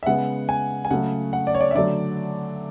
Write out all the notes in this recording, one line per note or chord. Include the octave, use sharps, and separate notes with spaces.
E5
C#3 G#3 B3 F#5
G#5
G#5
C#3 F#3 A3 F#5
F#5
D5
C#5
D5
E5
D3 F#3 A3 D5